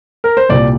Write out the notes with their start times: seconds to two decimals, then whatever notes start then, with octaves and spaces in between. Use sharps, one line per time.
0.24 A#4
0.37 C5
0.49 C2 A#2 G3 D5